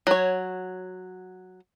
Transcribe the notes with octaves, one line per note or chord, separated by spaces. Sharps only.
F#3 C#5